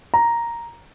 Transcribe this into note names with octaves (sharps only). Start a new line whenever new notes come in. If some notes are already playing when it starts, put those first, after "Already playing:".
A#5